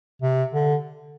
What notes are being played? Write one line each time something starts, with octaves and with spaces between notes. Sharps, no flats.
C3
D3